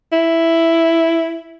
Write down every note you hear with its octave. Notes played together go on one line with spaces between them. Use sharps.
E4